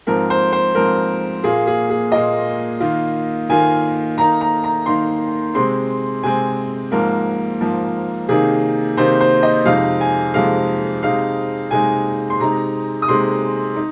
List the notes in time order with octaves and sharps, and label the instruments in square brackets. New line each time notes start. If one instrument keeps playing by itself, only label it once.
[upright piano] G#2 F3 C4 A#4
C5
C5
G#2 F3 C4 A#4
A#2 A#3 F4 G#4
G#4
G#4
A#2 A#3 F4 D#5
D#3 A#3 F4
D#3 A#3 F4 G#5
D#3 A#3 D#4 A#5
A#5
A#5
D#3 A#3 D#4 C6
C3 G#3 C4 C6
C3 G#3 C4 G#5
G#2 F3 A#3 A#4
G#2 F3 A#3
C3 D#3 A#3 D#4 G#4
C3 D#3 A#3 D#4 C5
C5
D#5
F2 C3 G#3 D#4 F5
G#5
F2 C3 G#3 D#4 F5
C3 G#3 D#4 F5
C3 G#3 D#4 G#5
C6
C3 G#3 D#4 A#5
D#6
C3 G#3 D#4 C6
D#4